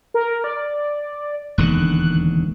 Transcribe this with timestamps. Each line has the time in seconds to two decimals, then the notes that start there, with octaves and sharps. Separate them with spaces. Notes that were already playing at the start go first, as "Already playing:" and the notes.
0.14 A#4
0.44 D5
1.58 E1 D#2 D3 F#6